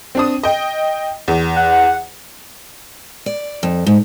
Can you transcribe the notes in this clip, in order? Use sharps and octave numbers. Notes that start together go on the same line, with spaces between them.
C4 D4 D#6
D#5 G5
E2
F#5
D5
F2
G#2